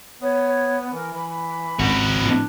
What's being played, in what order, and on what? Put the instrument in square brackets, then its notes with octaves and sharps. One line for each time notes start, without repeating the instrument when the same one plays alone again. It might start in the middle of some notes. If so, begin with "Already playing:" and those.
[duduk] B3 [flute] C#5
[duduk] E3 [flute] A#4
[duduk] E3 [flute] B5
[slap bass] G#1 C#2 C#3 [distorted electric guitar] C4 F#4
[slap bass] A2 F3 B3 [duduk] D4